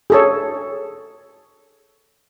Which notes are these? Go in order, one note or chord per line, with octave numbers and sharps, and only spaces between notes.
G#4 A4 C#5